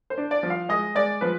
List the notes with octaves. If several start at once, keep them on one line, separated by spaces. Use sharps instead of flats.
C5
D4
D5
F3
F5
G#3 D#5
G#3 D5
F3 B4